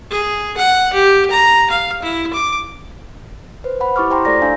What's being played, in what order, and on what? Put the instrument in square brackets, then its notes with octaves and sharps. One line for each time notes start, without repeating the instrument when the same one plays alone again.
[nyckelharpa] G#4
F#5
G4
A#5
F5
E4
D6
[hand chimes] B4 C5
F#5 B5
E4 G4 C#6 D6 F6
C5 G5 A#5 C6
A3 F#4 A4 D5 A#5 A#6
D4 F5 G#5